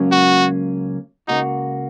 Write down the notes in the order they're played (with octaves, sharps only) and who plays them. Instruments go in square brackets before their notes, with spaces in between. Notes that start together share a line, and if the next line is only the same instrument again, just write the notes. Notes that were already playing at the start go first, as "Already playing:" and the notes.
Already playing: [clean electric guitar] C#2 C#3 F#3 A#3 C#4
[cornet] F#4
[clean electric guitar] C#2 C#3 A#3 F#4 [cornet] D#4